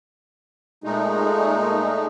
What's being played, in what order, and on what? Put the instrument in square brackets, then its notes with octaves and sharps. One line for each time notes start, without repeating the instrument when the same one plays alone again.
[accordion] A#2 G#3 A3 D#4